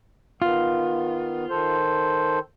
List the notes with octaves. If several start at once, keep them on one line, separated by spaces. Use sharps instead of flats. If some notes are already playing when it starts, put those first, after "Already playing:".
D#3 B3 F4
D#3 A4 C5